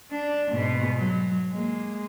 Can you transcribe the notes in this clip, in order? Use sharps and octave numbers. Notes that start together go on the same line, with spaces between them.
D4
G#2 B2
F#3
G#3 A#3